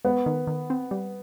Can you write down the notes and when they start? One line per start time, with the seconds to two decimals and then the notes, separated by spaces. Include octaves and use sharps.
0.04 G#3 B3
0.26 D#3
0.47 D#3
0.70 C4
0.91 G3